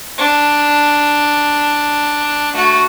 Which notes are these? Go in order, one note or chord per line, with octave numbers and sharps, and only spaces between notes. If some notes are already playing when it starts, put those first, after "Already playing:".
D4
A3 F#4